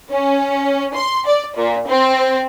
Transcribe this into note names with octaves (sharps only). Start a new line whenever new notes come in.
C#4
C6
D5
A#2
C4